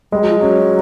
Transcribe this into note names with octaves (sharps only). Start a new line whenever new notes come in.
G3 G#3
F#3
F3
F#3 C#4